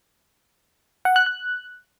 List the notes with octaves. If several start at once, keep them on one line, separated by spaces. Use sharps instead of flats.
F#5
F#6
F#6